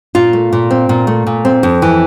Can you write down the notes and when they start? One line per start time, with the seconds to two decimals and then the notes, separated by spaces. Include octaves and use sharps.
0.15 A#2 F4
0.33 A3
0.53 A#2
0.71 C4
0.89 A#2
1.07 A3
1.27 A#2
1.45 C4
1.63 F2
1.82 E3